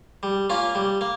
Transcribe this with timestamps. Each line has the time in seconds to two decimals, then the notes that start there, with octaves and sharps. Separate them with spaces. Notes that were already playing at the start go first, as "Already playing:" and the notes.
0.23 G3
0.50 A#3 C#4 F4
0.75 G3
1.01 A#3